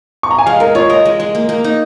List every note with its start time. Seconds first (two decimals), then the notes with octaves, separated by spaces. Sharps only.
0.23 C#6
0.31 A#5
0.38 G#5
0.46 G#3 F5
0.60 G#3 A#4
0.75 F4 C#5
0.90 A#4 D#5
1.06 G#3
1.20 G#3
1.35 A#3
1.49 A#3
1.64 D#4